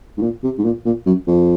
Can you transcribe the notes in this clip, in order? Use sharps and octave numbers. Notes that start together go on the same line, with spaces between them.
G#2
A#2
C3
G#2
A#2
A#2
F#2
F2